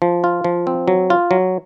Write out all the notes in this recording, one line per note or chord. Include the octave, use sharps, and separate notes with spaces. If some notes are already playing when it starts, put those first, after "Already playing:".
F3
F4
F3
C4
F#3
F4
F#3